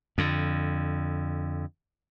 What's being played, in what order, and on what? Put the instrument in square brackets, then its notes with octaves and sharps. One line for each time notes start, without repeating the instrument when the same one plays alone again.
[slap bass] F2 D3